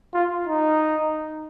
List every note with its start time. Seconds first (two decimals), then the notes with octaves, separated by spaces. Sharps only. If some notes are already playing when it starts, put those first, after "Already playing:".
0.14 F4
0.47 D#4